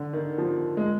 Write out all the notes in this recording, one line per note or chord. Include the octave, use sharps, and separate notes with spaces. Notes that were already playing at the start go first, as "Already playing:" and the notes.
Already playing: D3
D#3
F3
G#3